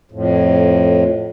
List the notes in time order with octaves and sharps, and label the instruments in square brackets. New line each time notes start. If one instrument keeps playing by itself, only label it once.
[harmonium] F2 A2